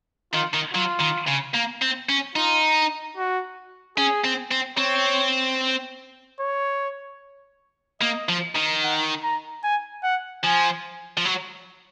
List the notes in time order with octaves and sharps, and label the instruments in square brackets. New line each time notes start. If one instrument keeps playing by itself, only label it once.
[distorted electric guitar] D#3 [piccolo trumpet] F4
[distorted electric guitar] D#3
[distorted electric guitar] F#3 [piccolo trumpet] F4
[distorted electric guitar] D#3
C#3
A#3
C4
C#4
[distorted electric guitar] D#4 [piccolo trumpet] F4
[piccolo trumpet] F#4
[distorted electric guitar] C#4 [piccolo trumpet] G#4
[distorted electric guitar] C4
C4
[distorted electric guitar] C4 [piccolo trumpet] C#5
[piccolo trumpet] C#5
[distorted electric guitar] A#3 [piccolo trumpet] D#5
[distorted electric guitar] F3
D#3
[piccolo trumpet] F#5
A#5
G#5
F#5
[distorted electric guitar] F3 [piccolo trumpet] G#5
[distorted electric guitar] F3
F#3